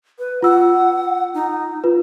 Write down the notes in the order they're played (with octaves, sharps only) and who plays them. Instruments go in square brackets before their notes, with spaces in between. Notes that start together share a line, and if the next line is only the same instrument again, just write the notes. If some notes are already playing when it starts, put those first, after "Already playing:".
[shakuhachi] B4
[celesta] F4 E6 [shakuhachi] F#5
[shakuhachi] D#4
[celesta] F4 B4